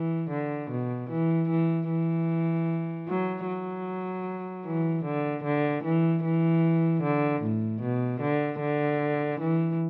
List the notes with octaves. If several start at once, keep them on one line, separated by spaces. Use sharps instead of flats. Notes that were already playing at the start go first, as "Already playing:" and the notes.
Already playing: E3
D3
B2
E3
E3
E3
F#3
F#3
E3
D3
D3
E3
E3
D3
A2
B2
D3
D3
E3